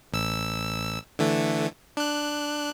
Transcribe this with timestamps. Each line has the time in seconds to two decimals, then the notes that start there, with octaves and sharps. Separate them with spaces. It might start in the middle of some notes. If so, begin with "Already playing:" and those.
0.13 A1 E6
1.19 D3 E3 A3
1.97 D4 F#6